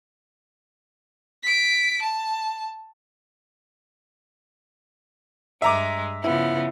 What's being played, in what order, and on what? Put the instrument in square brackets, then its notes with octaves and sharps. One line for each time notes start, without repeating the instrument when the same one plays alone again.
[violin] B6 D7
A5
[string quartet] G2 G#3 [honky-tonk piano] E5 A#5 D6
[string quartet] C#3 F3 B3 [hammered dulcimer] E4